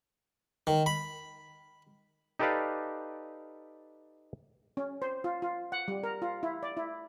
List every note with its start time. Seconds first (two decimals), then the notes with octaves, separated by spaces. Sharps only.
0.67 D#3
0.86 B5
2.39 D#4 G4 A4 B4 D5 F5
4.77 C#4
5.02 C5
5.24 F4
5.42 F4
5.72 F#5
5.88 G3
6.03 A#4
6.22 F4
6.43 E4
6.63 D5
6.77 E4